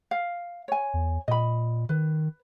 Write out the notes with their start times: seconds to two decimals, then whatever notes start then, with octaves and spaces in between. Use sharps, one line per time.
0.11 F5
0.68 C#5 G#5
0.94 E2
1.28 A#2 D#5 B5
1.89 D#3 B4